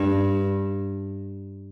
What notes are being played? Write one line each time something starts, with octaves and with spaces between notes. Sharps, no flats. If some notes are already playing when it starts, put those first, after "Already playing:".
Already playing: G2